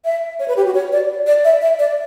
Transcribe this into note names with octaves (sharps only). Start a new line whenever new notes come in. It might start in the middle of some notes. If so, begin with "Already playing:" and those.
E5
C#5
B4
G4
F#4
C#5
D5
D5
E5
E5
D5